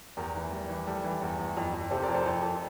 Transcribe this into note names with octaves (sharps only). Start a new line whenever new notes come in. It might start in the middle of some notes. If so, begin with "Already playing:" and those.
E2 G4 A#4
E3
G3
E3
G3 A4
E3
E2
E2
F2
F2
C3 A4 C5
A#4 D5
F2
A4 C5
F2 A4
F2